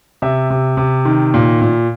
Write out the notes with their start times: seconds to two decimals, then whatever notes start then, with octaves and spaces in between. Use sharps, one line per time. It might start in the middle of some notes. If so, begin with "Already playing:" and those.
0.22 C3 E5
0.50 C3
0.77 C3
1.05 D#3
1.34 A#2
1.62 A#2